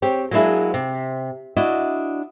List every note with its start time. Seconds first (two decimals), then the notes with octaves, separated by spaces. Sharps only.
0.02 C4 G4 C#5
0.31 F#3 G#3 A#3 D4 E4 G#4
0.74 C3
1.56 D4 E4 F#4 D#5